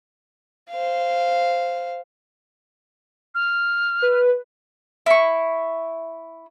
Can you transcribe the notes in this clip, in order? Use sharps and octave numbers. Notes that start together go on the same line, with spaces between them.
C5 F5
F6
B4
E4 C#6